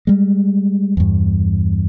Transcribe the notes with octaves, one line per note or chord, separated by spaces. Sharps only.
G3 G#3
E2 G2